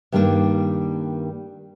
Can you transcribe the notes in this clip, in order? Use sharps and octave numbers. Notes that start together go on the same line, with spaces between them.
G2 D#3 G3 A3 A#3 D4